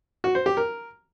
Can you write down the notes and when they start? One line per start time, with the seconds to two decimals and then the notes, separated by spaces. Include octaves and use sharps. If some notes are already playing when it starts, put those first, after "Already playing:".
0.24 F#4
0.35 C5
0.46 G4
0.57 A#4